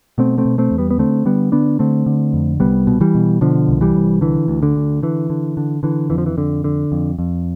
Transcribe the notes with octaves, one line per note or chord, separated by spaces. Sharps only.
B2 A3 C4
A3 C4
B2
A3 C4
E2
G3 B3
B3
D3 A3 C4
D3 G3 B3
D3 B3 D4
D3 A3 C4
D3
F2
C2 G3 B3
B2
E3 G3
B2
B2 D3 F3
C2
E3 G3
C2
D3 E3
D2
D3
D2
D3 E3
D3
D3
D3 E3
F2 E3
F3
E3
F2 D3
D3
F2
F2